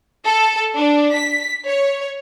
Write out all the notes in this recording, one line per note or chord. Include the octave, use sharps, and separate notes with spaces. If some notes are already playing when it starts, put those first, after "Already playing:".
A4
D4
B6
C#5